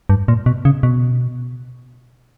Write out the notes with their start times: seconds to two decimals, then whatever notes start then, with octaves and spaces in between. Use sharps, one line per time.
0.09 G2
0.28 A#2
0.46 B2
0.65 C#3
0.83 B2